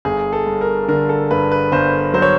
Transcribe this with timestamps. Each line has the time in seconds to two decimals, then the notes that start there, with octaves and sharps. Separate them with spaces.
0.05 G1 G#4
0.33 A4
0.47 G2
0.61 A#4
0.88 D3 A#4
1.09 A4
1.31 G2 B4
1.52 B4
1.72 G1 C5
2.14 F#3 C5
2.22 C#5